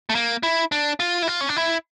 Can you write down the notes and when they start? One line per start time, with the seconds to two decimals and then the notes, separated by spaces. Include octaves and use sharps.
0.10 A3
0.15 A#3
0.43 E4
0.72 D4
1.00 F4
1.22 E4
1.28 F4
1.41 C#4
1.49 D4
1.57 E4